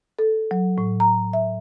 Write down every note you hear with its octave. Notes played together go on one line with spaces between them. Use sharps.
A4
F#3
A2
A#5
E5